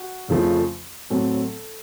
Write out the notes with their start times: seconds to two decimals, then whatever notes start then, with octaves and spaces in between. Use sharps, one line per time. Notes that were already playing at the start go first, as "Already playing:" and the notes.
Already playing: F#4
0.28 F2 C#3 F3 A3
1.10 A2 F#3 A3 C4 A4